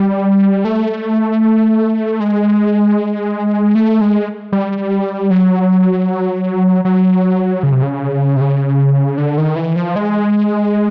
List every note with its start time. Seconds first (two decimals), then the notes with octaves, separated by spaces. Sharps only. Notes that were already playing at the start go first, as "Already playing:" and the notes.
Already playing: G3
0.65 A3
2.20 G#3
3.75 A3
4.01 G#3
4.52 G3
5.30 F#3
6.85 F#3
7.63 C#3
7.72 C3
7.82 C#3
8.36 C3
8.41 C#3
9.18 D3
9.38 D#3
9.56 E3
9.76 F3
9.96 G#3